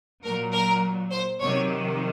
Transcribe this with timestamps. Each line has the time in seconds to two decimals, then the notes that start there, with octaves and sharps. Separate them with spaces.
0.24 A#2 F#3 A#4
0.53 A#4
1.11 C5
1.39 C3 D#3 F#3 C#5